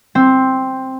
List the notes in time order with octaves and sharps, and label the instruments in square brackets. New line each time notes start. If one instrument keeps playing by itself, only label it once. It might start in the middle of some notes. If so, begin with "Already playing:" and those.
[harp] C4